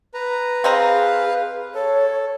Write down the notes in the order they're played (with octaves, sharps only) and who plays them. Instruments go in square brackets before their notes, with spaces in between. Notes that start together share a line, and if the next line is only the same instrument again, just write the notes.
[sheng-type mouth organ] B4 A#5
[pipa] C4 D#5 A#5 [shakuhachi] G#4 [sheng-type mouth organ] B4 F5
[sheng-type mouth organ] A4 [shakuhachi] C#5